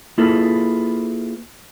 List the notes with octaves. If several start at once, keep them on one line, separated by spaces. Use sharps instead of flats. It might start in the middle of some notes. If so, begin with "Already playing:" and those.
A#3 E4 F4 G#4 A4 B4